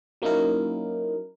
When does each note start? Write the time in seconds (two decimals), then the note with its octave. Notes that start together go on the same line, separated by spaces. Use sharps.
0.22 F#3 A#3 C#4 D#4 E4 A#4